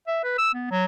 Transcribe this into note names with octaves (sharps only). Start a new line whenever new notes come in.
E5
B4
E6
B3
F#3